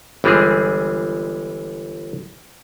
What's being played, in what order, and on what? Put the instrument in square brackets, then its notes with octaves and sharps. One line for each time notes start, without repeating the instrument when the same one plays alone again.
[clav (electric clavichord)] G1 E3 G3 G#3 C4 G#4